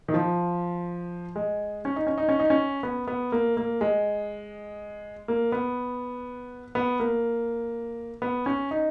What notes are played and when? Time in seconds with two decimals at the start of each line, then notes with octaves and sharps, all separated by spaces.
0.08 D#3
0.14 F3
1.36 G#3
1.85 C#4
1.96 D#4
2.07 C#4
2.18 D#4
2.29 C#4
2.39 D#4
2.50 C#4
2.83 B3
3.08 B3
3.32 A#3
3.57 A#3
3.81 G#3
5.28 A#3
5.52 B3
6.75 B3
7.00 A#3
8.22 B3
8.46 C#4
8.71 D#4